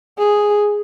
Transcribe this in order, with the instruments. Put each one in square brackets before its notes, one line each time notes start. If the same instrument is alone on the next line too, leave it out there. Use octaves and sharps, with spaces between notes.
[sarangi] G#4